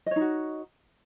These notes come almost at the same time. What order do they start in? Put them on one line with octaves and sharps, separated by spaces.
D#5 C#5 D#4 F#4